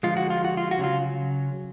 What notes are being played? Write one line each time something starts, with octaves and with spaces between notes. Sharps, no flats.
D3 F3 G#3 F4
F#4
F4
F#4
F4
F#4
C#3 F#3 F4